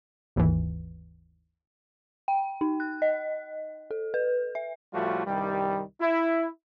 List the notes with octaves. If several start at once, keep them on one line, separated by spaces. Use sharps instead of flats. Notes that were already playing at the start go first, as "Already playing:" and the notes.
G1 D#2 G#2 E3
G5
D#4
F#6
D#5
A4
B4
E5
A2 F3 G3 A3 F4 F#4
C2 G2 D#3 G3
E4